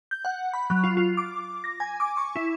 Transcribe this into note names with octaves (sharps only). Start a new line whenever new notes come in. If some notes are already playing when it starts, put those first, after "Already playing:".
G6
F#5
B5
F#3
F4
F4
D6
A#6
G#5
D6
C#6
E4